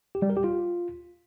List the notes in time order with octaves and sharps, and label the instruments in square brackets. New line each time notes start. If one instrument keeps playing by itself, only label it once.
[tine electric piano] G4
G3
A#4
G4
F4